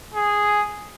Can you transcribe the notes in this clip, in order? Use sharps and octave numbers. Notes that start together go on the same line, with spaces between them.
G#4